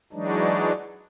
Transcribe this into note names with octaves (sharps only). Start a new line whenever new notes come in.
E3 F#3 G#3 D4 D#4